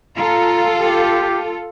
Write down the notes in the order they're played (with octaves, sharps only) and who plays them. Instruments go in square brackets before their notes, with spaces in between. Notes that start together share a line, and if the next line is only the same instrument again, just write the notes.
[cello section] F4 A4 [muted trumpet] A#5
[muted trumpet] G4